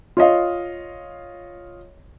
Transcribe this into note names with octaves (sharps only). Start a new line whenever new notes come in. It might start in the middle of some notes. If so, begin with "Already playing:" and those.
F4 C#5 D#5 F5